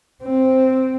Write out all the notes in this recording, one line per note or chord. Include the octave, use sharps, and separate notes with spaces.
C4